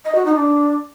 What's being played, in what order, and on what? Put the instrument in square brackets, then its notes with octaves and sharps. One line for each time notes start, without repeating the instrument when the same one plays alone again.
[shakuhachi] D#5
F#4
D#4
D4